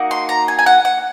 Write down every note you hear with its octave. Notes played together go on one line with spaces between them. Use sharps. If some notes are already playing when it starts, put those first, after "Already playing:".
Already playing: A#3 D#4 F#4
C6
A#5
G#5
G#5
F#5
F#5